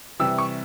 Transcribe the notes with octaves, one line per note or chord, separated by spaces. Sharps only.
C3 E3 G3 E6
C#6